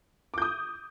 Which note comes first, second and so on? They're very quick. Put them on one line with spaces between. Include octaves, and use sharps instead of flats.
D6 G6 D#6